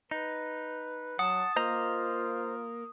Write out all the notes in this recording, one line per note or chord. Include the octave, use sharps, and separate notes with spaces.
D#4 B4
F#3 F#5 A5 D#6
A#3 F4 C5 D#5 A#5